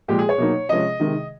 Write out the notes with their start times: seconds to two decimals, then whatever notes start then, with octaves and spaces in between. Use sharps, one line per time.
0.08 A#2 F3 G#3 G4
0.19 G#4
0.29 C#5
0.38 B2 F#3 A#3 D#4
0.69 C3 F3 G#3 C#4 D#5
0.99 C3 D#3 G#3